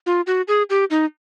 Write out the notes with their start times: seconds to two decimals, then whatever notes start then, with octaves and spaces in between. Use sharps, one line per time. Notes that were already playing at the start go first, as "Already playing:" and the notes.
0.06 F4
0.27 F#4
0.48 G#4
0.70 G4
0.90 D#4